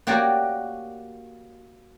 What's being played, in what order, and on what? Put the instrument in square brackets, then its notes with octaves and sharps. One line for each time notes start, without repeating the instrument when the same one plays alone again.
[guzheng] A#3 F#4 G4 C#5 D5